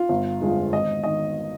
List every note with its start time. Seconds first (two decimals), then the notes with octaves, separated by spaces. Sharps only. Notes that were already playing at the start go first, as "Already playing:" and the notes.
Already playing: F4
0.09 G1
0.41 F2 D3 F3 G#3
0.73 G#1 D#5
1.03 D#3 D#5